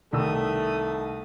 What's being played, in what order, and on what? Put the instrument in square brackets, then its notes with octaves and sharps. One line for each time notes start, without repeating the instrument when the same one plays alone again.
[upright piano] C2 D#3 E6 [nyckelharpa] A3 D#6